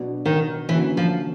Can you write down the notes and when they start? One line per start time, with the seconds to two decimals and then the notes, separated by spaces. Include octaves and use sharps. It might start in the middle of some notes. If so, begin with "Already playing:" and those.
Already playing: B2 F#3 B3 D4 F#4
0.26 D#3
0.69 D3 E3 F#3 A#3 C#4
0.97 F3